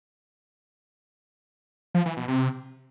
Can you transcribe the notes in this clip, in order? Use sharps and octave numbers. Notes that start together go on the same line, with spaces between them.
F3
E3
B2
C3